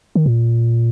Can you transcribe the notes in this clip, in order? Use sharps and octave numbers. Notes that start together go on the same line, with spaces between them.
D#3
A#2